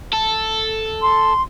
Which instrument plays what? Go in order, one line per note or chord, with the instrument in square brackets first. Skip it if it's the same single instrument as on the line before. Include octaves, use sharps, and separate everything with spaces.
[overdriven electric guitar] A4
[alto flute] C6